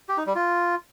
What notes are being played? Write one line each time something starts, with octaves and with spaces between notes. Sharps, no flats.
G4
D#4
G3
F4